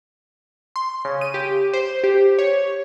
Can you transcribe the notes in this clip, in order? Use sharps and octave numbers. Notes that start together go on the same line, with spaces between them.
C6
C#3
D#7
G4
C5
G4
C#5